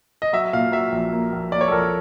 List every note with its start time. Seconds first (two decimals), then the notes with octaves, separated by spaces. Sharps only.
0.22 D#5
0.33 F#3 E5
0.53 A#2 F5
0.72 F#3 E5
0.92 A#1
1.13 A#3
1.32 A#1
1.52 A#3 D5
1.61 C#5
1.68 A4
1.71 A#1 A#4